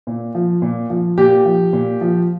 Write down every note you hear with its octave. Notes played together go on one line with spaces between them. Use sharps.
A#2
F3
A#2
F3
A#2 G4
F3
A#2
F3